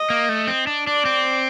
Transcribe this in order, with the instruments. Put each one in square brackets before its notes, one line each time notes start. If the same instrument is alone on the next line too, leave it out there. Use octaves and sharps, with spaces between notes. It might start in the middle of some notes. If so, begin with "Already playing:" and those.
Already playing: [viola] D#5
[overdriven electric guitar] A#3
A3
C4
D4
[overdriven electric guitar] D4 [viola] D5
[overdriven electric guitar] C4